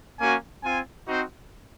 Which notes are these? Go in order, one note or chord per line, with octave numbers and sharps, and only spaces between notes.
A#3 C#4 F#4 G#5
C4 F4 G#5
C4 D#4 F#4 C5